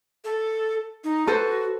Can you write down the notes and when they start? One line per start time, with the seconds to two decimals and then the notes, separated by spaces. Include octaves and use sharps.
0.25 A4
1.04 D#4
1.27 F#4 A4 B4 C5